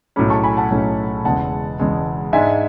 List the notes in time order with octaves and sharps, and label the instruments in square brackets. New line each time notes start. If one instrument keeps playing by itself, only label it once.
[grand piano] B1 A2 F#3 A3 C#4 [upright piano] B5 D6
[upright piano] A5 C#6
G#5 B5
F#5 A5
[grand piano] B1 A2 F#3 A3 C#4
[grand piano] E1 E2 C#3 G#3 [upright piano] F#5 A5
[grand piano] E1 E2 C#3 G#3
[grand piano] G#2 G#3 D4 [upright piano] E5 G#5